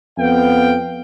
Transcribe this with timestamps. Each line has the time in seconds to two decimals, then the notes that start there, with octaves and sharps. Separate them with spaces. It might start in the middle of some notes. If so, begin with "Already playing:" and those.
0.18 F2 B3 F5 G5